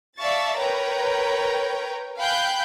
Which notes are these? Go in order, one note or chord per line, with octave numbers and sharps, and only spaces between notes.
D5 E5 F5 A5 C#6 A6
A#4 B4 C#5 G5 A#5
F5 G5 G#5 B5 F#6 G6